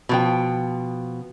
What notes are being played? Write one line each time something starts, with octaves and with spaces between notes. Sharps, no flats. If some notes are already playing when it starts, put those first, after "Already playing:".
B2 F3 G5